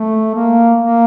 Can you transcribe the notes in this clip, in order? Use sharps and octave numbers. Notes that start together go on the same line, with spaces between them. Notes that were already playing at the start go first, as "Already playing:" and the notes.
Already playing: A3
A#3
A#3